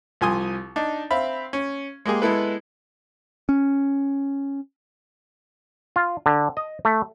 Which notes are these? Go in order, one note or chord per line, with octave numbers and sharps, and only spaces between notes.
C2 F3 G#5 C6 D#6
D4 D#4
C4 E5 F5 B5
C#4
G#3 A#3 G4 G#4
G#3 B3 E4 A4 B4
C#4
F4
D3
D#5
A3